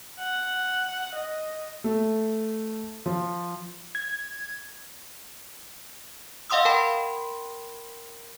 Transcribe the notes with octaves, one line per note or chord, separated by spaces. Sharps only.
F#5
D#5
A3
F3
G#6
D#5 F5 F#5 C6 D#6 E6
A#4 G5 A5 B5 C6